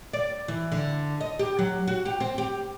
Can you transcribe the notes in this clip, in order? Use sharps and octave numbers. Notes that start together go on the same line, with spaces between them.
D5
E3
D3
D#5
G4
F#3
F#4
G4
C4
G4